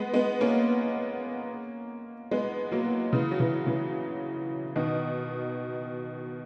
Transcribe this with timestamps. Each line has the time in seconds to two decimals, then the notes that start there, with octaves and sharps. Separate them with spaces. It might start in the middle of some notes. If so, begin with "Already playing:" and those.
Already playing: G#3 B3
0.13 G#3 B3
0.41 A#3 C#4
2.31 G#3 B3
2.71 F#3 A#3
3.13 C#3 E3
3.31 F#3
3.40 C#3 E3
3.66 C#3 E3
4.76 B2 D#3